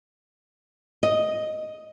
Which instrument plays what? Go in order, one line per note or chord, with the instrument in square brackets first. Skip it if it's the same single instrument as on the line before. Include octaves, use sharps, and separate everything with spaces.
[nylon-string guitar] D#5